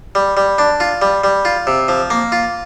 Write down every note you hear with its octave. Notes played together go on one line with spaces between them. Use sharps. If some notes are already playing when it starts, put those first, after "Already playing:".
G3
G3
D4
F4
G3
G3
F4
C3
F3
A#3
F4